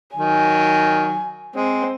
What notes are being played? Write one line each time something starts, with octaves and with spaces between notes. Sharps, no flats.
D#3 F#3 G#5
G#3 C4